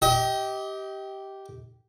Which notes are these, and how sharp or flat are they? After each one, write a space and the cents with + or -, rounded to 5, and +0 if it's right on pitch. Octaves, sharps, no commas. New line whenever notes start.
G4 -10 D#5 +35